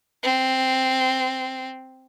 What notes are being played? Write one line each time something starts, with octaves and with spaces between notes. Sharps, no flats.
C4